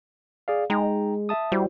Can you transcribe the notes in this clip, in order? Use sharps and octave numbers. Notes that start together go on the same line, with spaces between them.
G#4 D5 F5
G#3 D#4 G5 A#5
E5 A5 D#6
G3 E4 F#4 C5